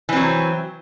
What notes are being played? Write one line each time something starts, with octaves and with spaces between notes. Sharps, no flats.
E3 F#3 C4